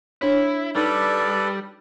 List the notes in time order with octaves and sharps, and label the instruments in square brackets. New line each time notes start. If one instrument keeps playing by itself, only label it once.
[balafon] D4 C#5 [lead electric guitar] E4
[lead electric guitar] G3 [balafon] D#4 [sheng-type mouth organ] A4 B4 D5